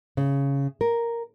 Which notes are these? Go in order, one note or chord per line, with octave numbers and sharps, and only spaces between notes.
C#3
A#4